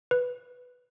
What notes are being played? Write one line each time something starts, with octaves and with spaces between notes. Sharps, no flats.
B4